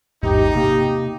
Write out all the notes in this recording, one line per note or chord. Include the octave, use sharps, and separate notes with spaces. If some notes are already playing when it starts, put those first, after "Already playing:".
A1 E2 G#2 D#4 G4
C3 A#3 G4